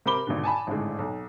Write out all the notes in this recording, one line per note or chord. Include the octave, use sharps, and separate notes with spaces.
C3 A#4 C5 B5 D6 G7
G#1 B2 D3
G#5 A5 B5
G#1 A2 D3 G#3
B1